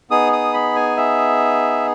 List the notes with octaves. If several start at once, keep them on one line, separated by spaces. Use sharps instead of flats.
B3 D#4 G#4 D#6
D#6
B5
G#5
E5